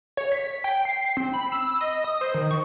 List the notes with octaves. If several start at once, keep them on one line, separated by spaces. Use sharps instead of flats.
C#5
B6
G5
C7
C4
B5
E6
D#5
D#6
C5
D#3
C#6